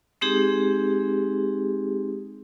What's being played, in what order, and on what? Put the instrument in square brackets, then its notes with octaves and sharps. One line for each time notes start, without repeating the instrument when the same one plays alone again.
[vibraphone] G#3 C4 D#4 G4 G#4